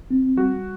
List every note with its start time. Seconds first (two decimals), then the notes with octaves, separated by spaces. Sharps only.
0.11 C4
0.37 G3 F#4